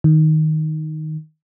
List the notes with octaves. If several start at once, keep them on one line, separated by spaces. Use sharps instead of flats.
D#3